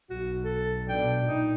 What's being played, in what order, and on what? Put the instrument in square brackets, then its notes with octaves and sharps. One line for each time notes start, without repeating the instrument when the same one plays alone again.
[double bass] B1 [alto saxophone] F#4
[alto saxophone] A4
[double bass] B2 D4 [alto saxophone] G5
[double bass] A#2 [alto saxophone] D#4